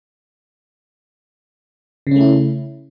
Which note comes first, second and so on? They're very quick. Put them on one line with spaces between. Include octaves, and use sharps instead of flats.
C#3 C#4 A3 E4